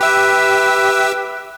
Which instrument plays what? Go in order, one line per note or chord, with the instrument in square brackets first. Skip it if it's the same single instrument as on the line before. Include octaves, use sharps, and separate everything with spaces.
[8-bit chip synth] G4 E5 E6 [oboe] B4